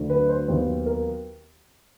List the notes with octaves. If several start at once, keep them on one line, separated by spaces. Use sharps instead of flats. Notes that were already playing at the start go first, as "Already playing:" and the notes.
Already playing: D2 D3 F#3 A3 D4
B4
C5
D#2 D#3 F#3 B3 C5
A#4